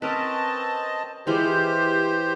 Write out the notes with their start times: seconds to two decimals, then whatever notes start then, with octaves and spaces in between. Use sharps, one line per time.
0.02 C4 C#4 A#4 B4 D#5 A5
1.27 E3 G#3 F4 G4 C5